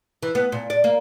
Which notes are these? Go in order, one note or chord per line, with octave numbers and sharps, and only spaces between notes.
E3
B3
A#2
D5
A#3